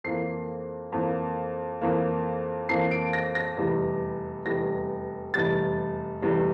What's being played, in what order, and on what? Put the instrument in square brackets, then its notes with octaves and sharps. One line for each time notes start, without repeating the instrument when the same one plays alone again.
[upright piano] F2 E3 A#3 C7
F2 E3 A#3
F2 E3 A#3
F2 E3 A#3 C7
D7
A#6
A#6
F1 E2 E3 G3
F1 E2 E3 G3 A#6
F1 E2 E3 G3 A6
F1 E2 E3 G3